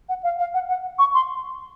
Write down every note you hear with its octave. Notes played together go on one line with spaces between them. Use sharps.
F#5
F5
F5
F#5
F#5
C#6
C6